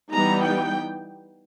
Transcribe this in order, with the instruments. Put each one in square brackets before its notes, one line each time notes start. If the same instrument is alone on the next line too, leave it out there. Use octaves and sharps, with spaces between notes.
[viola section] E3 G3 B3 D#4 A#5
G5